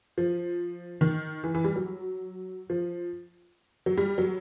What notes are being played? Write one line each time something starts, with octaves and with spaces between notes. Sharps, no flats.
F3
D#3
E3
E3
G3
F#3
F3
F#3
G3
F#3